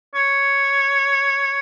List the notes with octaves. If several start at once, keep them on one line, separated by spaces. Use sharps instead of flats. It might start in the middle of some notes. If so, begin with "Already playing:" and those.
C#5